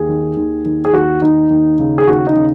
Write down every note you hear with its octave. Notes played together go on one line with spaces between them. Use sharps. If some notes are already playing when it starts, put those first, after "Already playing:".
Already playing: D#2 G#4
D#3
D#2
D#3
G#4
D#2 F#4
D#3 D#4
D#2
C#3
G#4
D#2 F#4
D#4
C#3